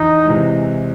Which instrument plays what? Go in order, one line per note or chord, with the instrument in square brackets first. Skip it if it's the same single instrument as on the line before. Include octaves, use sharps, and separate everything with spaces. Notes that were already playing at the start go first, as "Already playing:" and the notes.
Already playing: [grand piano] E2 [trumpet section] D#4
[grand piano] C3 E3 G#3